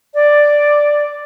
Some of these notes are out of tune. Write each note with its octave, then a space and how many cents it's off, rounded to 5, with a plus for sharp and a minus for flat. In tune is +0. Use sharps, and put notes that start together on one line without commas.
D5 +5